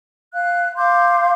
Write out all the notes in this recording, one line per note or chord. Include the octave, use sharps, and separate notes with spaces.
F5 F#6
F5 C6 D6 G6